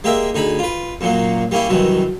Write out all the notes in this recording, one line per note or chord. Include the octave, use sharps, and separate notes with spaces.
G#3 A#3 G4 A#4 E5
D2 D#4 G#4 B5
F4 B4
F#2 A#2 F#3 A#3
G3 A#3 C#4 E4 G4
C2 F#2 D#3 E3 F#3